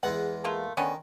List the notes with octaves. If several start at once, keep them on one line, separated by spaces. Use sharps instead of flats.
E2 G#3 B3 F#5
A3 A#3 F4
D3 D#3 B3 C#4